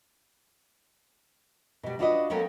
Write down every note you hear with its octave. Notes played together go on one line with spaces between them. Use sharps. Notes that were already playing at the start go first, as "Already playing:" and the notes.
B2 G3
D4 F4 F#4 B4 C#5 D#5
F#3 A#3 B3 C#4 A4 G5